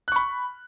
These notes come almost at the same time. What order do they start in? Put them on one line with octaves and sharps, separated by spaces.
F#6 C#6 B5